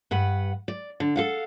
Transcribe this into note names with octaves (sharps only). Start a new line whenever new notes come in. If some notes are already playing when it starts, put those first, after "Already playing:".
G2 B4 F#5
D5
D3
A4 F5 F#5